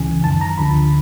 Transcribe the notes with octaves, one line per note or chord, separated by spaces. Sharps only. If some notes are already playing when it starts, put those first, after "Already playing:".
Already playing: C#2 C#3 E3 G#5
F#2 D#3 A5
A#5
D2 D3 F3 B5